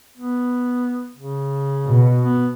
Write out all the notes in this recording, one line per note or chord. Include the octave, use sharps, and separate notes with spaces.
B3
C#3
B2
B3